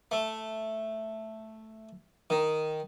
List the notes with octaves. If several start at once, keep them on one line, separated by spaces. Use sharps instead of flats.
A3
D#3